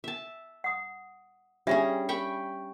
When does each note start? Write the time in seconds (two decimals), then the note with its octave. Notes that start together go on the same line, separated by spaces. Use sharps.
0.04 E5 A5
0.64 F#5 D#6
1.67 G3 C#4 D4 G#4 E5
2.09 G5 B5 C#6